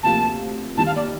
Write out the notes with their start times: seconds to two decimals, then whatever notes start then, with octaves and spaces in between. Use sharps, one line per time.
0.03 D2 C3 F3 A#3 F4 A5
0.77 D#2 D#3 G3 A5
0.86 F5
0.96 D5